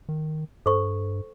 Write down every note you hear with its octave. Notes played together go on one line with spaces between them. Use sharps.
D#3
G2 A4 C5 C#6